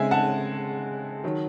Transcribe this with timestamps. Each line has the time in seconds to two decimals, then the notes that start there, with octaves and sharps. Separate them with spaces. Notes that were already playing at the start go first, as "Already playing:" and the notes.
Already playing: C#3 G#3 C4 E5 G#5
0.11 F#5 A5
1.24 D#3 F#3